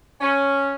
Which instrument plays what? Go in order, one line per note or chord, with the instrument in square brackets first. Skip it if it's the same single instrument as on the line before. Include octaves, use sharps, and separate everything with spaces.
[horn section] C#4